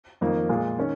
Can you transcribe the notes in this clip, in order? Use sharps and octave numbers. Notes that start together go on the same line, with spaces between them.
F2 D#3 A#3
A#2 G#3 F4
D#3 C#4